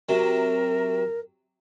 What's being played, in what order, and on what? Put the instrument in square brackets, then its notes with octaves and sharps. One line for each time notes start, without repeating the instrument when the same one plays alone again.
[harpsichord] C3 F#3 [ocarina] A#4